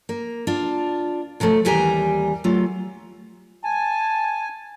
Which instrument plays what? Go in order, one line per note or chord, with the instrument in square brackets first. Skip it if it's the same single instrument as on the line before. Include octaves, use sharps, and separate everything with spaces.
[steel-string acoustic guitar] A#3
D4 F4
C3 F3 F#3 A3
D#2 E3 G3 G4 G#5 A#5
F#3 A3 F4
[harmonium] G#5 [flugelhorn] A5